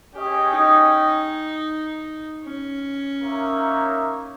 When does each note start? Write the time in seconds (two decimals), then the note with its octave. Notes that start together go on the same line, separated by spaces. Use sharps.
0.15 C#4 G4 G#4 D#5 G5
0.53 D#4
2.44 C#4
3.21 A#3 D#4 A#4 C#5 E5